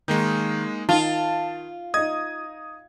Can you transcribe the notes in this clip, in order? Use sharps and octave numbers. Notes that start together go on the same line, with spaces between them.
D#3 G#3 A#3 D#4
D#3 F4 A5
D#4 D#5 D#6 G#6